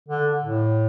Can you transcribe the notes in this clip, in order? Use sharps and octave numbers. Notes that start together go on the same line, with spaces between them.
D3
A2